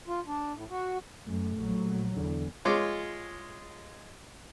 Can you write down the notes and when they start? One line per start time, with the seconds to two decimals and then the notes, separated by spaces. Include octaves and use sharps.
0.08 F4
0.27 D4
0.54 A2
0.70 F#4
1.27 F#2 A3
1.57 A#1 F#3
2.16 E2 D3
2.65 G#3 F4 C#5 C6 D6